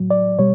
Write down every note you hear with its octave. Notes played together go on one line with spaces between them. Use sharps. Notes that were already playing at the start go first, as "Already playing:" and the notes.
Already playing: A2 F#3
D5
B2 G3 C#5